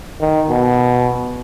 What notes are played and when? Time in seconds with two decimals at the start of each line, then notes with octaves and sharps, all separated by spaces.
0.21 D#3
0.50 B2